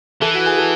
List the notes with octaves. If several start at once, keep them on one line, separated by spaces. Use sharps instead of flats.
E3 A4
F#4
G#4
A4